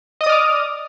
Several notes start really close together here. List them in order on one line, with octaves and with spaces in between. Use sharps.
D#5 D#6 D5 F6 D6